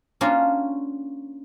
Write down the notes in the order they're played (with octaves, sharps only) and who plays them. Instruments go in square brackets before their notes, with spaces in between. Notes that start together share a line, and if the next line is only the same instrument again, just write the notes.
[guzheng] A#3 C#4 D4 F4 F#4